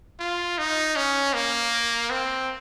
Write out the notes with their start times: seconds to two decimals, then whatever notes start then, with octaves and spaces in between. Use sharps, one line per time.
0.20 F4
0.58 D#4
0.96 C#4
1.34 A#3
2.10 C4